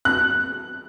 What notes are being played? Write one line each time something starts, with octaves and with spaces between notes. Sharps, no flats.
F#6